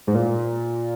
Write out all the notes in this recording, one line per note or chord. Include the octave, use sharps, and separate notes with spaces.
G#2
A#2